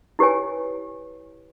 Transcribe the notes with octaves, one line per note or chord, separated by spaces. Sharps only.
E4 G4 B4 C#5 G#5